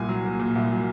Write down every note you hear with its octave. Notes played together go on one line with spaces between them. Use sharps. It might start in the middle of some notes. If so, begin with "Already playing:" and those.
Already playing: C2 A#2 G#5
F#3
A#3
A#2
C2
F#3